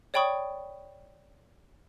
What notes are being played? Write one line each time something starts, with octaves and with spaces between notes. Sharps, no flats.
C#5 D5 G5 B5 C#6 D#6